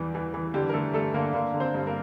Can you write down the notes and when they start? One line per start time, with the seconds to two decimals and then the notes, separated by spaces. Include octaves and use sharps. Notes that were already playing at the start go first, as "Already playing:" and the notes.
Already playing: E2 E3 G3 G4
0.15 E3
0.34 E3
0.54 D3 G3 G4
0.69 A#4
0.73 D3 A3 A4
0.93 G2 A3 A4
1.14 D3 A#3 A#4
1.33 D3 A#3 A#4
1.54 D3
1.60 C4 C5
1.74 G2
1.87 A#3 A#4